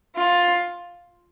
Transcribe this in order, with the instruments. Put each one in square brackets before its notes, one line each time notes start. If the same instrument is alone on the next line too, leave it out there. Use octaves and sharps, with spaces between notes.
[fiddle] F4